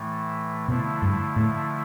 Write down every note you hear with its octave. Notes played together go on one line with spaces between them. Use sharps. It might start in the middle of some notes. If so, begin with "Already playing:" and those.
Already playing: A2 E3 A3
B2 D3 F3 A3 E4
G2
A2